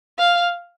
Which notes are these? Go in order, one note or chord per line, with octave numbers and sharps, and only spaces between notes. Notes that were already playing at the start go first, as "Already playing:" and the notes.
F5